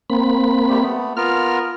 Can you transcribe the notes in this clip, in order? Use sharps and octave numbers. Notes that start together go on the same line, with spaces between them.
A#3 C4 B5
G3 A3 G4
A3 B3
B3 F4 A#4 F6